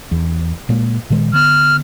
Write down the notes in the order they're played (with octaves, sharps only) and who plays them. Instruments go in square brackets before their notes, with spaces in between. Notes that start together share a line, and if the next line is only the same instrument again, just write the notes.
[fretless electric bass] E2
A#2 G#3 A#3
A#2 D#3 G#3
[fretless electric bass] D3 B3 [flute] F6